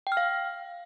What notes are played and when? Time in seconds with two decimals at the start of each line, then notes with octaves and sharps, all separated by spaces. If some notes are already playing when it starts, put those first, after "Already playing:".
0.07 G5
0.12 F6
0.17 F5